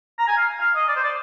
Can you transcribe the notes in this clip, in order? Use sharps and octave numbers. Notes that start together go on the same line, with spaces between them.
A#5
G#5
F5
F5
D#5
D5
C5
D5